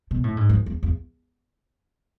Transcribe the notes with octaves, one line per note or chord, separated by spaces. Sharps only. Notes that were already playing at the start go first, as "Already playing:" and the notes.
B2
A2
G#2
F#2
E2
E2